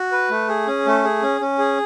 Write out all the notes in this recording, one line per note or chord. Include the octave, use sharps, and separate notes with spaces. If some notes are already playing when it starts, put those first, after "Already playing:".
Already playing: F#4
B4
A3
G#4
C#4
A3
G#4
C#4
C#4
G#4